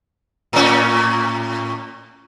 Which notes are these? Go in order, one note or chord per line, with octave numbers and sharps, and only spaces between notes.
A2 C#4